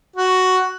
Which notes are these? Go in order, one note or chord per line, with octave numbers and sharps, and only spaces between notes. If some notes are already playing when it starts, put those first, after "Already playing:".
F#4